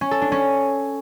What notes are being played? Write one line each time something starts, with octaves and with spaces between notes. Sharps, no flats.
C#4
A4
D4
C#4